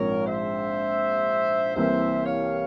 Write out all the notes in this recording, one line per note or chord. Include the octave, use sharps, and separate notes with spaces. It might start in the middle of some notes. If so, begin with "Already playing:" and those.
Already playing: A#1 G#2 F3 C4 A#4 C#5
C5 E5
C2 C3 E3 A#3 C5 E5
C#5 F5